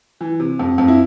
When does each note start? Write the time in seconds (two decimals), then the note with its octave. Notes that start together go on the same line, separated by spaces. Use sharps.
0.21 E3
0.40 C3
0.59 F2
0.78 F2
0.88 E4